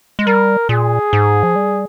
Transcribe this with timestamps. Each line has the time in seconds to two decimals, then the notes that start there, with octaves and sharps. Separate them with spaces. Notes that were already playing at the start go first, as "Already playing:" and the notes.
0.19 G#3
0.27 G3 A#4
0.69 A#2 G#4
1.13 G#2
1.43 F3
1.55 G3